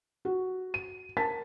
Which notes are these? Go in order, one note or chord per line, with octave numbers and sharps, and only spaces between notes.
F#4
D#7
A#4 A5 A6 B6